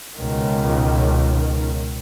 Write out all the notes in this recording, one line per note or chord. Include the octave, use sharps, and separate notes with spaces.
C#2 B2 D#3